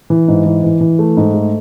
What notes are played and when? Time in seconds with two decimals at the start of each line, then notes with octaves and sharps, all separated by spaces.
0.10 E3
0.28 G#2
0.46 E3
0.64 E3
0.81 E3
0.99 A3
1.17 G#2
1.34 A3